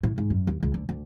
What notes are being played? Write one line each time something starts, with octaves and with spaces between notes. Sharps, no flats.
A2
G#2
F#2
D#2
C#2
D2
D2